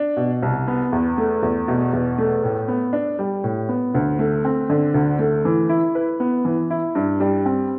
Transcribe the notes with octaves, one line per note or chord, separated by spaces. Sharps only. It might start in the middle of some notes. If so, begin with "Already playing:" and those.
Already playing: D4
B2
C2
B3
E2
A3
E2
B2
E2
A3
A2
B3
D4
G3
A2
B3
D2
A3
C4
D3
D2
A3
E3
E4
B4
B3
E3
E4
G2
G3
C4